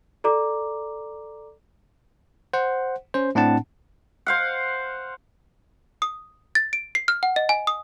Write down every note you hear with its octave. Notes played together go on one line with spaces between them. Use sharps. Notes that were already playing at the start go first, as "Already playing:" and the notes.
A4 D5 A#5 D6
C5 F#5
C#4 C5
A2 C4 D4 F#5 A5
C5 F5 F#5
D#6
A6
D7
C7
F6
F#5
D#5
G#5
D#6